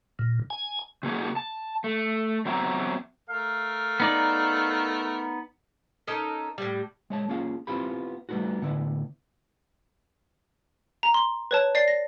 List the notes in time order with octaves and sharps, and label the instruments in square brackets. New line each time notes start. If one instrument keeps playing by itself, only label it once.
[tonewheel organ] A#2
G#5
[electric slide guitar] C3 A#3 F#4 G#4
A5
A3
F#3 B3 C4 F#4 E5 A#5
[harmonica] A3 A#4 [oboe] F5
[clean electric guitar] B3 D#4 D5
[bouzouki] C#4 D#4 A4 A#4
A2 G3
[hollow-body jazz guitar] G#3 C#5 A5
A#3 C#4 F4 G#4 F5
B3 C4 E4 F4 G4 B5
G3 A3 B3 C#4 D#4 F#4
A2 D3 B3 E4
[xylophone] A#5
C6
B4 C#5 A5
D5 A6 C7
A#6